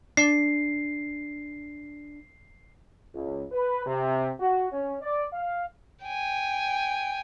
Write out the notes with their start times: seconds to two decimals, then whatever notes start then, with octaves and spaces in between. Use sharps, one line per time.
0.17 D4 C7
3.14 C#2
3.52 B4
3.86 C3
4.40 F#4
4.71 C#4
5.02 D5
5.32 F5
6.05 G5 G#5